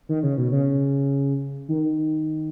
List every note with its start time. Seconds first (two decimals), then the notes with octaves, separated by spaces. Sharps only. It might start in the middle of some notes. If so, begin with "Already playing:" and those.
0.09 D#3
0.23 C#3
0.38 B2
0.52 C#3
1.69 D#3